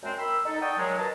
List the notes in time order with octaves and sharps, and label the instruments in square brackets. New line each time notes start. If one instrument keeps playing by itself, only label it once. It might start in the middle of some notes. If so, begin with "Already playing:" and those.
[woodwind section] F#2 G#3 C4
A#4 G5 B5 C6 E6
D#4 A4
D5 F#5 G5 A5 C#6 D#6
D#2 F#3 G#3
F#2 A#4 B4 D#5 A5